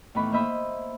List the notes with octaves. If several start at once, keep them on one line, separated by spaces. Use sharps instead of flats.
A2 D#3 E3 B3 B5
A#3 C5 D#5 E5 B5 D#6